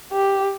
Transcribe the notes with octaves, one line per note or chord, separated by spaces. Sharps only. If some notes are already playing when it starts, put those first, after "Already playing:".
G4